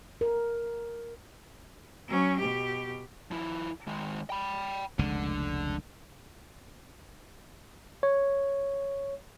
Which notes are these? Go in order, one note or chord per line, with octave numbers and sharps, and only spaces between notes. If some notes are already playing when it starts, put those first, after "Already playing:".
A#4
F#3 C#4
B2 G4
F3 E4
D#3 G#3
G5 B5
F1 C#2 D3 G#3
C#5